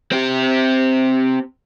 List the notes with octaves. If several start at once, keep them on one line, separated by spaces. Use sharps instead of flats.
C4 G4